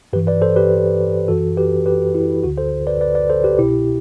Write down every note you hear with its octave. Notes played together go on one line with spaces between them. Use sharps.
G2 E3 G4 B4
B4 D5
A4 C5
G4 B4
F#2 E3 F#4 A4
G4 B4
G4 B4
E4
D2 D3 F#4
A4 C5
B4 D5
B4 D5
B4 D5
A4 C5
G4 B4
C2 B2 E4 G4